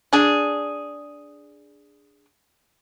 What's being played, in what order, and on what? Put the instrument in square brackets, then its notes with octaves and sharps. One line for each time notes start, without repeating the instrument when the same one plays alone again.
[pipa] D4 G#4